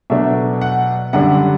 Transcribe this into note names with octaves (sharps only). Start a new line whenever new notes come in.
B2 F#3 A3 D4 E5
F#5
F#2 D3 G3 D4 F#5